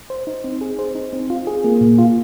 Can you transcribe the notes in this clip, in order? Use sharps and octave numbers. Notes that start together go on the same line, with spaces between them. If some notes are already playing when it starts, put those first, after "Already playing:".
C5
D#4
C4
G#4
C5
D#4
C4
F4
G#4
A#3
A#2
F4